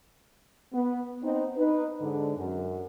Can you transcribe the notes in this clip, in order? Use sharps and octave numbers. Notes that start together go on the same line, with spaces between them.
B3
B3 C4 D#4
D#4 B4
G#2 D3
F#2